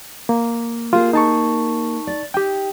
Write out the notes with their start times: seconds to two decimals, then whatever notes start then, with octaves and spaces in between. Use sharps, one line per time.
0.29 A#3
0.93 A#3 F4 G4 G#4
1.13 D#4 A5 C#6
2.07 D5
2.34 D#4 G4 G5